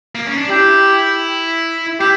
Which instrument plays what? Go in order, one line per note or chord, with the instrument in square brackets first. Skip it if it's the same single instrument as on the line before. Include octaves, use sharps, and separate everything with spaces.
[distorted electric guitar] A#3
C#4
D4
[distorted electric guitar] E4 [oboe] G4
[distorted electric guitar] E4 [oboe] G4